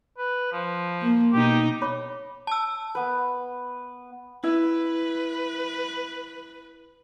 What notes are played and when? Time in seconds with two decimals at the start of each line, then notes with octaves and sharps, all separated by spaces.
0.18 B4
0.52 F3
1.02 A#3
1.33 B2 D#4 G4
1.82 C#5 B5 D6
2.47 A5 E6
2.95 B3 B4
4.44 E4 B4